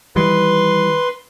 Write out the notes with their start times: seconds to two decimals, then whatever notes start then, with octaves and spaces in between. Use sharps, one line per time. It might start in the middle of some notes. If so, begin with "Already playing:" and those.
0.16 D#3 E3 G3 B4 C6